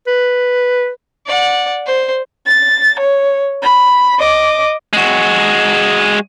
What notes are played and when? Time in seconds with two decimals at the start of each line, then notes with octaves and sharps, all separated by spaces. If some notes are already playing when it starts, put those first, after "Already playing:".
0.07 B4
1.27 D5 F#5
1.86 C5
2.46 A6
2.99 C#5
3.62 B5
4.18 D#5 D6
4.93 G#3 F#4